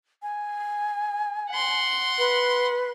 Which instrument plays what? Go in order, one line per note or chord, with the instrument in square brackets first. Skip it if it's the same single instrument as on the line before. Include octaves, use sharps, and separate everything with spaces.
[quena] G#5
[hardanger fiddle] F#5 C6
[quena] B4